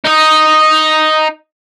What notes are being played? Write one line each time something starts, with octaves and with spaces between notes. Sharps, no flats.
D#4 D#5